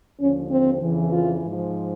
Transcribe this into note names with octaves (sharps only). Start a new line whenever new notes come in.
D#2 D3 F3 C#4
C4
F2 C#3 E3
F4
G#2 F3